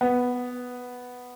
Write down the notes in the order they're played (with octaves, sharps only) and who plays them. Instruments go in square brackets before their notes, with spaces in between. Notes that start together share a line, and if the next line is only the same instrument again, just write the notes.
[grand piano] B3